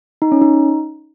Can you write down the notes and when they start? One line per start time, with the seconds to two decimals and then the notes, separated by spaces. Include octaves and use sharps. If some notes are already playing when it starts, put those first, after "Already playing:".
0.22 D#4
0.32 C#4
0.42 D#4